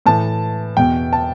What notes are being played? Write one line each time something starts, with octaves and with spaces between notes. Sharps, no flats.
A2 E3 A5
E2 B2 G5
A5